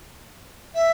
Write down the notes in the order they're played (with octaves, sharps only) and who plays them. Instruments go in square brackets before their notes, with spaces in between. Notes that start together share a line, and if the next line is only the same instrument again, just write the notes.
[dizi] E5